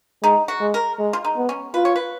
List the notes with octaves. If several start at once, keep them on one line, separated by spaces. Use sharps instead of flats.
G#3 D#4
F#4
G#3
A#4
G#3
F4
D#4
B3
C#4
F4 B4
C#5
B4